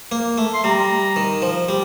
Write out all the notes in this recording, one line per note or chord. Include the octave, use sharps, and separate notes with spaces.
A#3
A3
C6
G3 A#5
D#3
F3
G3